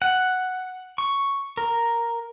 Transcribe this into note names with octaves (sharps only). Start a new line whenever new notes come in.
F#5
C#6
A#4